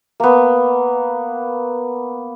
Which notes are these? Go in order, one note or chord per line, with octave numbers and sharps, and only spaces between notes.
A#3 B3